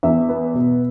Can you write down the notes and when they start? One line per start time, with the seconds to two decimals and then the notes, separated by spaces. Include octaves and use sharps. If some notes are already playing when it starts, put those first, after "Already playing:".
0.03 E2 E5
0.29 B3
0.54 B2